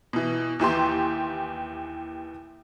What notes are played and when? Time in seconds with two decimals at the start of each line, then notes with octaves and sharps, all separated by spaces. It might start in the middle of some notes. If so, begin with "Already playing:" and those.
0.13 B2 E3
0.59 D#2 E3 G4 C6